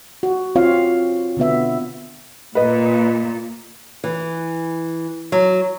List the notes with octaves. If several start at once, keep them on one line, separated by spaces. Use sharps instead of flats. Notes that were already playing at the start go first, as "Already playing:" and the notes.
F#4
C4 F4 C#5 F5
B2 D3 B3 E5
A#2 B4 D#5
E3
F#3